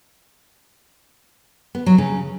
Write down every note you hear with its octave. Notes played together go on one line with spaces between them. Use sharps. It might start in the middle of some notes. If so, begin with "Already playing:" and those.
B3
F#3
C#3